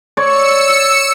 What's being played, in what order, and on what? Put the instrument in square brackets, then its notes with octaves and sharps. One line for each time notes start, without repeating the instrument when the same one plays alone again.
[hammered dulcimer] C#5 D5 [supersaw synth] E6 C#7